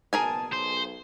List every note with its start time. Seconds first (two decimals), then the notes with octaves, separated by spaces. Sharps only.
0.13 F#1 B2 G#4 A#4 G#5 A5
0.52 B1 C5